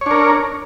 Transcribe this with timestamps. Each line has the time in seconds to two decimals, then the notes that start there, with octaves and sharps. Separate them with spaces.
0.01 C#5
0.06 D4
0.11 A#4